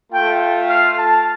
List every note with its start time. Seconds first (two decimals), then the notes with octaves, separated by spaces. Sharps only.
0.12 A3 F4 G5
0.70 F5
0.98 A5